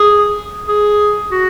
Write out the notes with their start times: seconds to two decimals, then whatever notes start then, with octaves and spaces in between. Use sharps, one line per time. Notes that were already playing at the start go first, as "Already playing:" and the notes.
Already playing: G#4
0.68 G#4
1.32 F#4